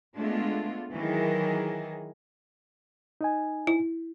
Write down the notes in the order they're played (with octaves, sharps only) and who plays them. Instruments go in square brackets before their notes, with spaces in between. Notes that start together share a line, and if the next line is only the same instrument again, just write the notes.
[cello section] G#3 A3 B3 D4 F4
D#3 E3 F#3 G#4 A#4
[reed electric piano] D#4 D#5 G#5
[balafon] E4